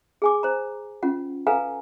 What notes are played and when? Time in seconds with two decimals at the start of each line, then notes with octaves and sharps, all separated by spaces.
0.22 G#4 G#5 D6
0.43 C5 A#5
1.03 C#4 F4 F#5
1.47 A4 B4 F5 F#5 G#5 A#5